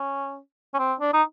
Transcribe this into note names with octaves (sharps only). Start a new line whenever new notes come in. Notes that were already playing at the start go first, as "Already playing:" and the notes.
Already playing: C#4
C#4
C4
D4
D#4